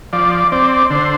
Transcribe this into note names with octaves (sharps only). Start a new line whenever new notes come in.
F3 D5
C4 D5
D3 C5